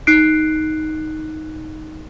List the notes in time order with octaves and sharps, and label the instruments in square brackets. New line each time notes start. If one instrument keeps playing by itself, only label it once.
[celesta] D#4 F#6 C7 D7